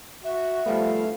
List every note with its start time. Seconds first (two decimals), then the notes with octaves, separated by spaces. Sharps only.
0.24 F#4 E5
0.66 F3 G3 A3 B3 F5